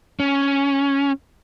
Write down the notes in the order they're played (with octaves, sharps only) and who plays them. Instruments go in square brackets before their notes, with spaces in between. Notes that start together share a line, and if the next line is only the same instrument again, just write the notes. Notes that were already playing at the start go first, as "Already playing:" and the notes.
[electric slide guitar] C#4